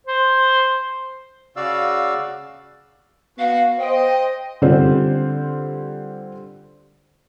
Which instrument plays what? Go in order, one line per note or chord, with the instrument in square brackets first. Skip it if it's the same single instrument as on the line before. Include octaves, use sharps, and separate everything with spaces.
[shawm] C5
[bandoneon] C#3 F#4 D5 F5 E6
[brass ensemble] B3 F#4 [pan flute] F5
[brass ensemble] C5 D#5 [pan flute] G5
[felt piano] D3 G3 C4 F4 C5